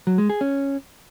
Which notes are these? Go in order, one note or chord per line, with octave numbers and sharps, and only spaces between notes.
F#3
G#3
G#4
C#4